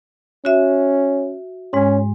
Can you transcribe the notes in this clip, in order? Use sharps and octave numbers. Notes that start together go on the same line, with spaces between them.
C#4 F#4 E5
G#2 G#3 C#4